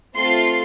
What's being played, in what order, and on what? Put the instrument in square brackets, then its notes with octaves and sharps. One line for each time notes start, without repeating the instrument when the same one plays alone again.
[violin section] A3 C4 F4 A4 C6